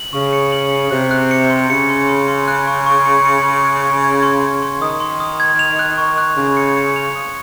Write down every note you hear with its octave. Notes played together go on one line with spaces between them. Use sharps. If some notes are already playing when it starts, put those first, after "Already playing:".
Already playing: F#7
C#3 C#6
C#7
F#7
C#7
C3 F#6
F#6
C#7
C6
C#3 C#7
C6
C6
C6
F#6
C#6
C#6
C#7
C#7
C#6
F#6
C#6
G#6
C6
C6
C6
D#3 D#6
C6
D#6
G#6
F7
F#6
C#6
F#6
C#3 F#6
C#7
C#7
F7
D#6